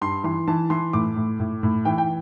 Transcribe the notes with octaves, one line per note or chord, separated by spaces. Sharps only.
G2 C6
E3 C6
E3 A5
E3 C6
A2 D6
A2
A2
A2
E3 G5
G5